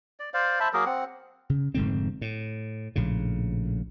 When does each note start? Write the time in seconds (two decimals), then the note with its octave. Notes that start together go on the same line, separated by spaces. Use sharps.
0.20 D5
0.34 C5 D5 F5
0.60 C5 E5 A5 B5
0.73 F#3 A#3 G#4 A#4
0.86 C4 F#5
1.50 C#3
1.74 F1 G#2 D3 C4
2.21 A2
2.96 A#1 A2 C#3